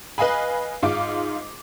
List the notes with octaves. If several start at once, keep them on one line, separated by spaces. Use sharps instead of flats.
B4 D#5 F5 G#5 B5
G#2 F4 D6